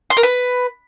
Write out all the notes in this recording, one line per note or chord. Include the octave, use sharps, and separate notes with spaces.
C6
A#4
B4